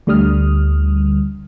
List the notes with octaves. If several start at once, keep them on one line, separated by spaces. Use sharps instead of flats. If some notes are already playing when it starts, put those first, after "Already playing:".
D2 D3 G3 D#6 F6